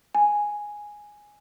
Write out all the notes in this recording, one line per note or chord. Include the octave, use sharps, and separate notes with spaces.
G#5